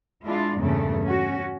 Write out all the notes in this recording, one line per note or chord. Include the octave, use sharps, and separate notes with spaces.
G#3 D4 E4 F4
E2 G2 A#2 C#3 A3
C#4 F#4